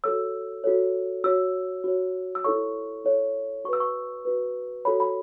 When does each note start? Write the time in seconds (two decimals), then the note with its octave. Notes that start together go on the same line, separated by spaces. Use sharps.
0.04 F#4 A4 C#5 E6
0.64 F#4 A4 C#5
1.24 F#4 C#5 E6
1.84 F#4 C#5
2.35 E6
2.44 E4 A4 C#5 C#6
3.04 E4 A4 C#5
3.65 F#4 C#6
3.68 B4 E6
3.80 C#6
4.25 F#4 B4
4.85 F#4 A4 C#5 B5
5.00 B5